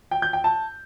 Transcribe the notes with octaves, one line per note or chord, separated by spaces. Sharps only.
G5
G6
G5
A5